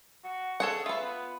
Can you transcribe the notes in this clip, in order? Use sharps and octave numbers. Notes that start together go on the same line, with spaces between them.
F#4
G#4 A4 C#5 F#5
F4 B4 E5
B3